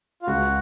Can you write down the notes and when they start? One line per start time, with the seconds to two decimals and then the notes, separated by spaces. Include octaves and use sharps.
0.22 F4
0.27 C#2 F#4